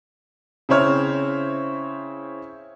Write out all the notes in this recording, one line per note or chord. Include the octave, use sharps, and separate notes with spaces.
C#3 C4 E4 C5 C#5 F6